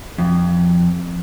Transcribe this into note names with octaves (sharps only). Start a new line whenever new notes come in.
F2